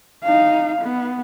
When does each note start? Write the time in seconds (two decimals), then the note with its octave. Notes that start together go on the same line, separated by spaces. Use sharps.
0.23 D#4 F5
0.81 B3